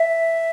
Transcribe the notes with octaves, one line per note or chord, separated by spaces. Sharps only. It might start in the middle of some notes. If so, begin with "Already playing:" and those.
Already playing: E5